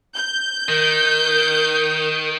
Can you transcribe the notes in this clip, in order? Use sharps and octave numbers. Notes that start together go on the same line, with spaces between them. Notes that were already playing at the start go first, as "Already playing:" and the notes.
G6
D#3 A#4